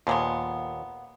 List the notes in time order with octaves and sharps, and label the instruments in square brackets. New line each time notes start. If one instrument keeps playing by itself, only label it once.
[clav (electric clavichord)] D#2 A#2 [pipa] F3 G#3 B3